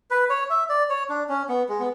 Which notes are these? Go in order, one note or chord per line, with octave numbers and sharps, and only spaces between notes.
B4
C#5
E5
D5
C#5
D4
C#4
B3
G#3
B3